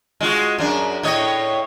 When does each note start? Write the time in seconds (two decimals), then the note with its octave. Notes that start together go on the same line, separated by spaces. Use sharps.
0.21 G#3 F4 F#4
0.58 F#2 D4
1.03 A2 C#5 D#5